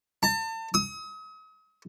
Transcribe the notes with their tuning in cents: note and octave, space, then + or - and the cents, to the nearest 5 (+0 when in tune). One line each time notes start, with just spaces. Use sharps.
A5 +35
D#6 +40